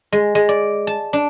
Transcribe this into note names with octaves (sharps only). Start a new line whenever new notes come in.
G#3
G#3
D5
A5
D4